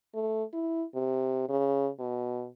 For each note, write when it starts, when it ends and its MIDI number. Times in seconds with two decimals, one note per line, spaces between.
0.14 0.43 57
0.53 0.84 64
0.95 1.49 48
1.49 1.89 49
1.99 2.47 47